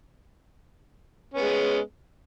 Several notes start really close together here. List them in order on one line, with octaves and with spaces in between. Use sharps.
C#4 B3 G#3